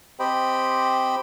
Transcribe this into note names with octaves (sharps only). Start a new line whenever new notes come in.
C4 G4 C5 D#5 G5 B5